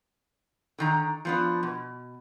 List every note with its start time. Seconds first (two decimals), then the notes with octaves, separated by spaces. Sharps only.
0.78 D3 D#3 A#5
1.25 F3 B3 D4
1.63 B2